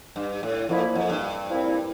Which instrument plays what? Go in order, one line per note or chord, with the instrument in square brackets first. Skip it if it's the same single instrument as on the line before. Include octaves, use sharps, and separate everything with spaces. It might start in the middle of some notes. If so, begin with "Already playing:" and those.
[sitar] G2
A2
[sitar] F2 [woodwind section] A#2 F3 A#3 E4
[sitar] F2
G2
[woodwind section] A#2 F3 C4 E4